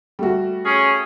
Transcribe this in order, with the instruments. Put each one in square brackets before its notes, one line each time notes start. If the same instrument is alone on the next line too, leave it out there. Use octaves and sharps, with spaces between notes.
[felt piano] G3 A3 F#4
[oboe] C#4 [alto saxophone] G#4